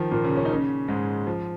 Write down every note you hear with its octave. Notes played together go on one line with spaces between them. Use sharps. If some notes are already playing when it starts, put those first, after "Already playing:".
Already playing: D#3 F3
A#2 A#3
C#3 C#4
C#4
D#4
C#3 C#4
G#2 G#3
F3